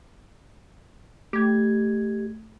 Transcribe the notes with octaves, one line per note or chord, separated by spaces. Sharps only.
A3 G4 G#6